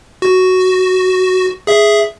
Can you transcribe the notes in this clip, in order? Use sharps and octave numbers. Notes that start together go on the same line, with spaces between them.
F#4
G#4 E5